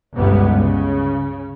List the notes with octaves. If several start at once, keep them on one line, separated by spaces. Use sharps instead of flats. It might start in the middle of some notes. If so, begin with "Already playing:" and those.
G1 C#2 G2 C3 G#3 B3
C#3